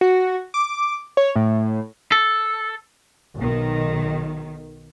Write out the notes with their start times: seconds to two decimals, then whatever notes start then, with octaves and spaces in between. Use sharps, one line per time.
0.01 F#4
0.54 D6
1.17 C#5
1.35 A2
2.12 A4
3.36 B1 D#3